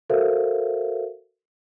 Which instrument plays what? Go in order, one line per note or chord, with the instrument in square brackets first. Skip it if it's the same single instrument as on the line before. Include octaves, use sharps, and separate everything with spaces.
[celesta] F#4 A4 A#4 C5 E5 F5